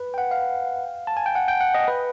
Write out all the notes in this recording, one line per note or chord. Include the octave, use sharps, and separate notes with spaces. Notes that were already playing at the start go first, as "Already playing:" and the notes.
Already playing: B4
G5
F#5
F5
A5
G#5
G5
F#5
G5
F#5
D#5
B4